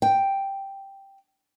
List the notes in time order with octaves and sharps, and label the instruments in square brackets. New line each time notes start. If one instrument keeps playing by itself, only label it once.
[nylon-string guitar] G5